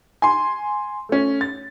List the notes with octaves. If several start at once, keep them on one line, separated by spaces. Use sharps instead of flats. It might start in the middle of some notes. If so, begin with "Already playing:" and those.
G#5 C6
A3 C#4
A6